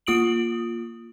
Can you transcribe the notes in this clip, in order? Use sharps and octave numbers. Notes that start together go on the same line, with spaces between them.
A#3 F4 D#6 D7 F#7